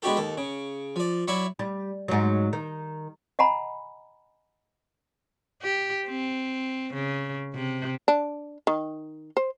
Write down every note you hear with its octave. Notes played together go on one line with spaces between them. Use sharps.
G#3 B3 D4 F#4 G4 A4
D#2 A4
C#3
F3 D5
F#3 E4 D5 E5 C#6
G3
G#2 F#3
D#3
D#5 F#5 G#5 A#5 B5
G4
C4
C#3
C3
D4
D#3
C5